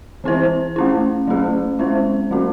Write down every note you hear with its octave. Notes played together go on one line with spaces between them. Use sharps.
E3 C4 E4 C5
A3 C#4 E4
F#3 A3 C#4 G#4
G#3 C#4 E4 C5
F#3 A3 C#4 F#4